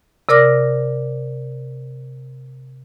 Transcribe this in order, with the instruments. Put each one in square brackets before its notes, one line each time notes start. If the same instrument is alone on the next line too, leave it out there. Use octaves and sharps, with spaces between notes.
[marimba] C3 A#4 D5 D6 F6 A#6